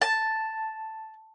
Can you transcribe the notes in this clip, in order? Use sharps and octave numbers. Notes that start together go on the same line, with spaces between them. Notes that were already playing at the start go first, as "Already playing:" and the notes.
A5